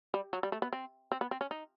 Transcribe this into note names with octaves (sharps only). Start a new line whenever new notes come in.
G3
F#3
G3
A3
B3
C4
C4
B3
C4
C#4
D#4